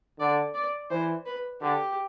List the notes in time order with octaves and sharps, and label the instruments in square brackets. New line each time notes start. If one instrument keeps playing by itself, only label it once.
[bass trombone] D3 [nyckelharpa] D5
[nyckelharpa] D5
[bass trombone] E3 [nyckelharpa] C5
[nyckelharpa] B4
[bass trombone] D3 [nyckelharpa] G4